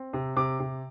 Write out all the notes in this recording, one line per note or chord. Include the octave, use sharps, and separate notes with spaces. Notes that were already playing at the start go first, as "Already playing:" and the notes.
Already playing: C4
C3
C3 D6
C3